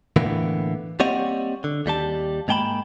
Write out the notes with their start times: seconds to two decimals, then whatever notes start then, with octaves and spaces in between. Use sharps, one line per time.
0.16 A2 D3 E3 A#3 B3
1.00 G3 A#3 C4 C#5 D#5 F#5
1.64 D3
1.86 D#2 G3 G4 A5
2.48 G#2 G#3 A#3 G5 A5 B5